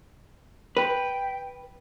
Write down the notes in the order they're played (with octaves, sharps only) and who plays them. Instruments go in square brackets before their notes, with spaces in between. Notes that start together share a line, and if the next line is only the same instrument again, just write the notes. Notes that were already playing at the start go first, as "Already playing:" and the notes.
[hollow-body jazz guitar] B4 [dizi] G5